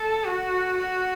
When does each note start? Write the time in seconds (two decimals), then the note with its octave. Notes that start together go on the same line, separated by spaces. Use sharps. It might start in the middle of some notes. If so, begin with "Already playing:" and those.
Already playing: A4
0.25 F#4
0.78 F#4